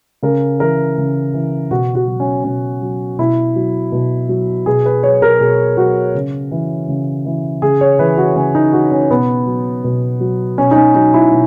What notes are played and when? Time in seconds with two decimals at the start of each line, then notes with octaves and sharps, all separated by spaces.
0.23 C#3 A#4
0.60 E3 A#4
0.98 C#3
1.34 E3
1.71 B2 F#4
1.95 F#4
2.07 F#3
2.20 C#4
2.44 B2 C#4
2.82 F#3
3.18 B2 E4
3.56 F#3
3.92 B2
4.29 F#3
4.66 B2 G#4
4.86 B4
5.03 F#3 C#5
5.22 A#4
5.40 B2 G#4
5.77 F#3 F#4
6.15 C#3
6.51 E3
6.88 C#3
7.26 E3
7.62 C#3 G#4
7.81 C#5
7.99 E3 B4
8.17 F#4
8.36 C#3 C#4
8.55 D#4
8.73 E3 F#4
8.91 C#4
9.10 B2 B3
9.47 F#3
9.84 B2
10.20 F#3
10.58 B2 C#4
10.71 D#4
10.76 C#4
10.95 F#3 D#4
11.14 E4
11.32 B2